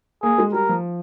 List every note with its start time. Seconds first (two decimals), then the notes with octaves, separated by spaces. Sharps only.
0.23 A#3 G#4
0.38 G#3
0.53 G3 A#4
0.69 F3